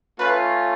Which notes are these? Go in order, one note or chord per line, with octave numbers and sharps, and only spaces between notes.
A3 C#4 F4 B4